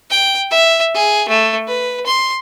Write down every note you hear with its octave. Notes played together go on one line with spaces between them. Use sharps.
G5
E5
G#4
A3
B4
C6